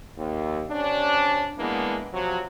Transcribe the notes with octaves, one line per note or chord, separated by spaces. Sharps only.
D#2
C3 C#4 D4
E3 G#3 A#3 B3 D4
C3 F3 F#3